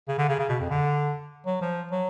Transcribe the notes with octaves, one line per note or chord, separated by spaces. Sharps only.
C#3
D3
C#3
C#3
B2
F2
D3
F#3
F3
F#3